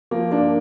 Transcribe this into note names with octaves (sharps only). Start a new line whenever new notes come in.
F3 A#3
A#3 D4